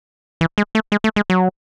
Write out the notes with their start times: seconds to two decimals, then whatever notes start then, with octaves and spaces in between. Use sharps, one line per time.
0.41 E3
0.58 G#3
0.75 A3
0.92 G#3
1.04 A3
1.16 G#3
1.30 F#3